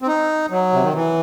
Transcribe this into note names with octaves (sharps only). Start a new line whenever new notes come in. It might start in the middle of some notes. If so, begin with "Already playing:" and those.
C4
D#4
F#3
C3
D#3
E3